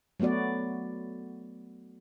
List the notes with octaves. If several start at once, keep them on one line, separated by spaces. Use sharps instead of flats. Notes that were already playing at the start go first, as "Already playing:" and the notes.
F#3 A3 B3 F#4 D5